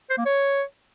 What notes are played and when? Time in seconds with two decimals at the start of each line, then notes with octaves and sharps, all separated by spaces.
0.10 C5
0.18 A#3
0.25 C#5